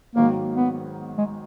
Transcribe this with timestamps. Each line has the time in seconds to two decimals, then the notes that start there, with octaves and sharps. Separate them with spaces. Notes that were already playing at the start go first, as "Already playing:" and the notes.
0.16 G#2 D#3 F#3 A#3
0.56 B3
1.18 G#3